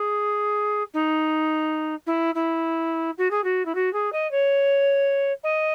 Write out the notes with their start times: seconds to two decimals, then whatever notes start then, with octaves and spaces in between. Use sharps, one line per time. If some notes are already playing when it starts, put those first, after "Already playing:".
Already playing: G#4
0.93 D#4
2.06 E4
2.34 E4
3.17 F#4
3.30 G#4
3.44 F#4
3.65 E4
3.74 F#4
3.93 G#4
4.12 D#5
4.31 C#5
5.43 D#5